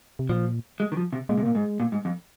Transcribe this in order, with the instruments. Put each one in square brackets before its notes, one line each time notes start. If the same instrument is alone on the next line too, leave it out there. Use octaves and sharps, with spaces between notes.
[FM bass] C3
[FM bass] A#2 [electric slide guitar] F3
[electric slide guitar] G#3
D#3
F3
C3
[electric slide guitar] A#2 [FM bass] G#3
[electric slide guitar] C3
[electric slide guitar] A#2 [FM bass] A#3
[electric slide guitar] G#2 [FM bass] G#3
[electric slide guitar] A#2
G#2
F2